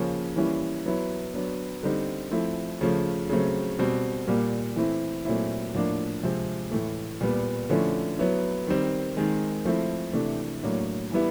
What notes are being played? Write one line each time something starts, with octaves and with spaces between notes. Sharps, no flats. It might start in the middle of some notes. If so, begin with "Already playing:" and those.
Already playing: C#3 F3 A#3 C#4
E3 G3 A#3 C#4 E4
F#3 B3 E4
F#3 B3 D4
D3 G3 C4 D#4
F3 A3 C4 E4
C#3 F3 A3
C#3 F#3 A3 C4
B2 G3 C4
A#2 G3 A#3
E3 A3 C4 E4
A#2 F#3 A3 C4 E4
A2 F3 A#3 D4
C3 F3 G#3 C4
A2 E3 A3
A#2 G3 B3
D3 F3 A3 C#4 E4
F#3 B3 E4
D#3 G3 C4
D#3 G#3 C4
F3 A3 C4 E4
C3 E3 A3 D4
A2 F#3 A#3 D4
E3 G3 B3 E4